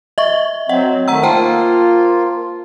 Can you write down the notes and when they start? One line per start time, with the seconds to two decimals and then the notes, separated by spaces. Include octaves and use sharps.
0.18 D#5 E5 C#6
0.69 F#3 C4 D#5 F#5
1.08 D#3 A3 F#5 A#5 E6
1.23 A#3 F4 C5 G5 A5